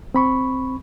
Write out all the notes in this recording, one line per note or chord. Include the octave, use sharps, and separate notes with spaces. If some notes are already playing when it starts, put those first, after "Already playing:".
C4 B5 C#6